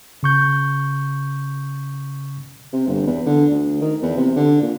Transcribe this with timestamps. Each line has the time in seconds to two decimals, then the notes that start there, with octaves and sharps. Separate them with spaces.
0.23 C#3 C#6 G6
2.72 C3
2.87 G1
3.07 E2
3.26 D3
3.50 D2
3.81 D#3
4.02 E2
4.17 C3
4.36 D3
4.61 A#2